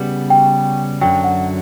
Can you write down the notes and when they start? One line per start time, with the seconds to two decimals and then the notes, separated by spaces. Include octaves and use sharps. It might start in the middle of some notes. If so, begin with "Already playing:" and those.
Already playing: C#3 G3 B3 F#4
0.30 G5
1.01 F#2 D3 F#3 G5
1.24 F#5